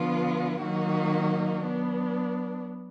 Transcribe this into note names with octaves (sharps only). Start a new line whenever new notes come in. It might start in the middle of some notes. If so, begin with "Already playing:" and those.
Already playing: D3 F3 B3 F4
D#3 F#3 A#3 D#4 F#4
F#3 B3 D4